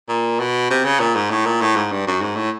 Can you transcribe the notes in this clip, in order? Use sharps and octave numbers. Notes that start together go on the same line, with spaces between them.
A#2
B2
C3
C#3
A#2
G#2
A2
A#2
A2
G#2
G2
F#2
G#2
A2